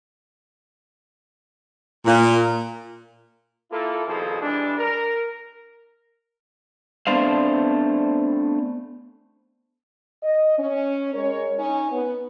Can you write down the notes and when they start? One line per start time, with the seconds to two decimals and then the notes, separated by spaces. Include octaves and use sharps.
2.06 A#2
3.72 A#3 E4 F4 A4
4.07 C2 B2 D#3 F3 G#4 A4
4.42 E3 G3 G#3 D4
4.78 A#4
7.07 A3 B3 C4 D4 C5 F5
10.23 D#5
10.59 C#4
11.14 G#3 A#4 C#5
11.59 C#4 D#4
11.92 B3